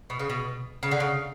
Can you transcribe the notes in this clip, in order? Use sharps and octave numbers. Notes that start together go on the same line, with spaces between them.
B2
C#3
B2
C#3
D3
C#3